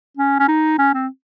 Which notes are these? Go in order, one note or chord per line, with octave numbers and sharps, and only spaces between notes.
C#4
C#4
D#4
C#4
C4